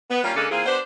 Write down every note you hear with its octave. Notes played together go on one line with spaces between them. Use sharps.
B3
G3 A#3 C#4 D4 F4 G4
C#3 G#3 A#3 C#4 D4 A4
E3 A#3 C4 F4 G#4
B3 D4 G4 C5